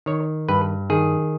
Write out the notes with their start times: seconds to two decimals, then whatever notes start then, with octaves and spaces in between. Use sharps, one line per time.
0.06 D#3 C#5
0.49 G2 B4
0.90 D#3 G#4